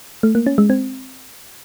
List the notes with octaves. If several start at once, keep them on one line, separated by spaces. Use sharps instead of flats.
A3
A#3
C#4
G#3
C4